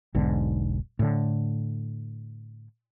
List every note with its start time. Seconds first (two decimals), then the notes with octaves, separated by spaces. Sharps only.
0.14 E1 B1 G#2 D3
0.99 A2 D3